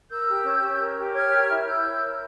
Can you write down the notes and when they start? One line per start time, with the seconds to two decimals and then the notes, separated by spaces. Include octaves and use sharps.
0.10 A#4 E6 G6
0.27 G4
0.44 C#4
0.62 C#4
0.79 A#4
0.97 G4
1.14 C#5 F6 G#6
1.31 A#4
1.49 E4
1.66 E4 E6 G6
1.83 C#5
2.01 A#4